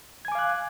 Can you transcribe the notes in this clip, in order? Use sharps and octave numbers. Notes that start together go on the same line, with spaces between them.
F5 G#5 D6 F#6 G#6